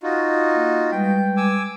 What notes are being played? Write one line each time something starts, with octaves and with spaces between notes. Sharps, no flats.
D#4 F4 F#4
A#3
G3 G#3 B4 G5
G#5 D6 E6